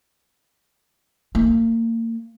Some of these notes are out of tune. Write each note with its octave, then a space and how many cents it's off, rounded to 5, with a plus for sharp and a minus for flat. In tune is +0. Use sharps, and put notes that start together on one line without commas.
A#3 -35